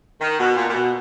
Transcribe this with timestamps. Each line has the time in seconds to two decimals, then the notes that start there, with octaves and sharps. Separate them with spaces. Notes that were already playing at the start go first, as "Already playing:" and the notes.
0.21 D#3
0.39 B2
0.56 A#2
0.69 A#2
0.74 B2